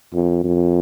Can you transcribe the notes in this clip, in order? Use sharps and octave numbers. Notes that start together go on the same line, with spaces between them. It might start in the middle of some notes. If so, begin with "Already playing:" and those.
F2
F2